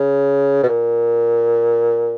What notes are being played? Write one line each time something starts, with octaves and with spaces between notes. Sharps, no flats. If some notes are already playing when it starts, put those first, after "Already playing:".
Already playing: C#3
B2
A#2